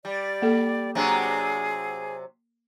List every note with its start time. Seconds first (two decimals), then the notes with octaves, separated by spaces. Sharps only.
0.05 G3 D5
0.42 A#3 A4
0.95 C3 F#3 D4 G#4